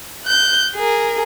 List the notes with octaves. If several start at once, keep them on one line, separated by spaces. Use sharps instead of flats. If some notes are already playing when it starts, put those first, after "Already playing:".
F#6 G6
G#4 A#4